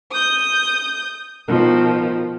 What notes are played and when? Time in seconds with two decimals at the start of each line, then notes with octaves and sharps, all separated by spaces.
0.11 D#6 G6
1.48 B2 D#3 F3